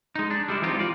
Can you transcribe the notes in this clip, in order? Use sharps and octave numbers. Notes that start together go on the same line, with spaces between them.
G#3 D#4
D4
G3 G#3 E4
E3 G#3 C4 D#4 F4 G4
F4 D5